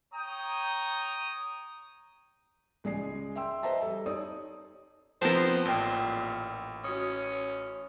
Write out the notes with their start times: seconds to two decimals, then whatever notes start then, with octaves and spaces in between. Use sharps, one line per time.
0.14 C#5 G5 A#5 D#6
2.84 C#2 G#3 G#4 D5 G#5 C7
3.36 E5 G5 C6 E6
3.63 B4 C5 D#5 E5 A5 A#5
3.82 G3 A4
4.06 D#4 C#5 D5 D#6
5.22 F3 B3 C4 A#4 C5 A5
5.65 A1 A#2 G5 G7
6.84 C#4 F#4 D#6